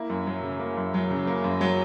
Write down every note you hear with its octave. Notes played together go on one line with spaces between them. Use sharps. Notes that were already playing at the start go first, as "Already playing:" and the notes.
Already playing: A#3 E4
F#2
F#3
C#3
A#3
F#2
F#3
C#3
A#3
F#2
F#3